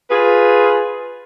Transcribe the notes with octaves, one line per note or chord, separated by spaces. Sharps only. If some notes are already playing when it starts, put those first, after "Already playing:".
F4 G#4 B4